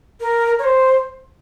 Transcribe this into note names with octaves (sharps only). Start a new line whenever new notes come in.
A#4
C#5
C5